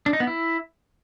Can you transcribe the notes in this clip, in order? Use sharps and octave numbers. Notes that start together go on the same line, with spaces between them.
D4
D#4
B3
E4